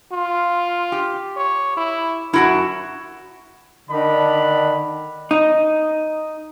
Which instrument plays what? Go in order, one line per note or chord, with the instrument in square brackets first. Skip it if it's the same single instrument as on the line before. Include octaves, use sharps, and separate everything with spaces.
[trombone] F4
[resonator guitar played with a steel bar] G4
[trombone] C#5
E4
[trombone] F#2 [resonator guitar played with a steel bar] E4 F#4 A5
[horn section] D3 D#3 D4 B5
[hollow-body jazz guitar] D#4